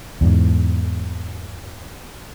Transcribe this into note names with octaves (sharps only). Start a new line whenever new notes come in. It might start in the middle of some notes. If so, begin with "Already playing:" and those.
E2 G#2